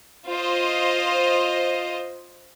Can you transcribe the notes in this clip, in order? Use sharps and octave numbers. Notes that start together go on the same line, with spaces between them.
F4 C5 D#5